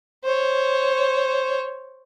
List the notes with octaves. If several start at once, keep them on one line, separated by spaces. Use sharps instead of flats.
C5 C#5